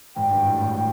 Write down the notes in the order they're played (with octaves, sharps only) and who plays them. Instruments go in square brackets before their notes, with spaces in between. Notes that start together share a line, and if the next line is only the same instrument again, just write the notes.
[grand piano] G#1 G#2 [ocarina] G5
[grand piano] G2
A1 A2
G#1 G#2